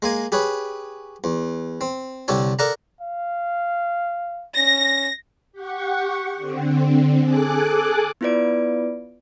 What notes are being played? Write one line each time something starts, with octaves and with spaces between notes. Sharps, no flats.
G#3 A#3 G#5
G4 G#4 B4 C#5
E2
C4
C2 D3 G4 A4 C#5
A4 A#4 D5 F#5 A5 A#5
F5
C#4 A#6
G4 F#5 C#6
D3 C4
G#4 A4 G#5 D6 F#6
B3 E4 F4 B4 D5 D7